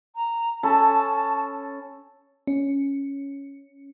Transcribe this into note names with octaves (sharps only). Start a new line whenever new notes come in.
A#5
C#4 A4 A5 B5
C#4